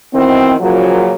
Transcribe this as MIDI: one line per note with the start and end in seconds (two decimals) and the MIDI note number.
0.13 0.54 47
0.13 0.54 51
0.13 0.54 52
0.13 0.54 60
0.60 1.12 42
0.60 1.12 46
0.60 1.12 49
0.60 1.12 53
0.60 1.12 54